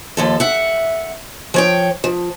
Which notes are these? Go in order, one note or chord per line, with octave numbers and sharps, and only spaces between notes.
D#2 F3 A4
E5 F#5
F3 C#5 G5
F3